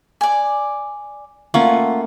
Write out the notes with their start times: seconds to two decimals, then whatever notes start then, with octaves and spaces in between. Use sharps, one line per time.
0.21 D5 G#5
1.54 A3 A#3 C#4 F4 F#5 C#6